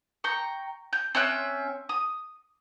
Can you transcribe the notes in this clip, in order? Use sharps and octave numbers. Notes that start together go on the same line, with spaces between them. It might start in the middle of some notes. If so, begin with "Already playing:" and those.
G5 A#5 C#6
G6
C4 C#4 E5 F#6
D#6